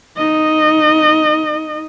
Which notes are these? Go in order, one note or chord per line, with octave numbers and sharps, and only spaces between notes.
D#4 D#5